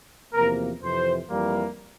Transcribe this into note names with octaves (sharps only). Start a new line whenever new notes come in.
E2 C3 F3 A#3 A#4
F2 C3 E3 C5
F2 E3 G3 A#3